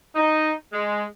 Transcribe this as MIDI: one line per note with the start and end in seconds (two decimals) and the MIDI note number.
0.16 0.53 63
0.73 1.04 56